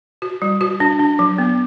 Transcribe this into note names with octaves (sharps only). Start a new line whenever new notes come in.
F#4
G3
F#4
D4
D4
F#3
B3